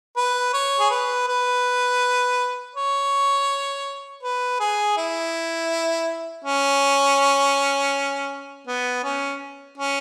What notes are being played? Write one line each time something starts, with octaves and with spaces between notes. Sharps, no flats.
B4
C#5
G#4
B4
B4
C#5
B4
G#4
E4
C#4
B3
C#4
C#4